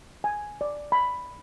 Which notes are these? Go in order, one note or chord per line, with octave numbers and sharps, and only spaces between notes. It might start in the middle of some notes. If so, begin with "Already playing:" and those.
G#5
D5
B5